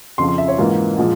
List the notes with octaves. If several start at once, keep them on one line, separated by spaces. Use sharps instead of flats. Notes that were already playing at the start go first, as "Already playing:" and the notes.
F2 C#3 F3 C6
C6
E5
C#5
G#2 E3 A#3 C#4 F4
A#2 F3 G#3